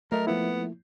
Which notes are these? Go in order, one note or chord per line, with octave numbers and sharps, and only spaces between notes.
F#3 A3 A#4 D#5
F3 A#3 B3 E4